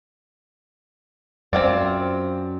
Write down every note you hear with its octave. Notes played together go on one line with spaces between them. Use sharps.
F#2 C4 F4 D5